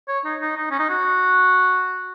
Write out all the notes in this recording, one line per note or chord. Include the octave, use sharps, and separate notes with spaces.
C#5
D#4
D#4
D#4
C#4
D#4
F#4